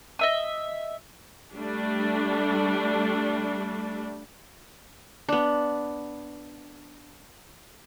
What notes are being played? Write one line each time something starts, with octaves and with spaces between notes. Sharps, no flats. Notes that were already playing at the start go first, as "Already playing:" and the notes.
D#5 E5 D#6
G3 A3 D4
B3 D4